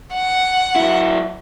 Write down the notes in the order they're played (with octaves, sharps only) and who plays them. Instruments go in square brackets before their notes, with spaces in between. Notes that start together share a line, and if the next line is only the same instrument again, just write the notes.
[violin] F#5
[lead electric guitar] F#3 E4